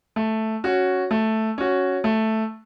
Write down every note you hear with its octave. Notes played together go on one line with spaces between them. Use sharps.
A3
C#4 F#4
A3
C#4 F#4
A3